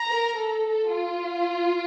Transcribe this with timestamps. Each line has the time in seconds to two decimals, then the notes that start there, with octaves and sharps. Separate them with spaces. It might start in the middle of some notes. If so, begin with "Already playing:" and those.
Already playing: A#5
0.08 A#4
0.36 A4
0.65 A4
0.93 F4